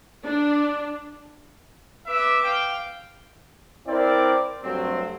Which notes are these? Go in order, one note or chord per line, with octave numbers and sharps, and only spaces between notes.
D4
B4 E5 D6
F5 G5
C4 E4 A#4 D5
G2 F#3 A3 C4